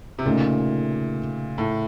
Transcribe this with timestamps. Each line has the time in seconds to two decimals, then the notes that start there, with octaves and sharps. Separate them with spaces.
0.18 C3
0.25 A#2 C#3 A3 D#4
1.58 A2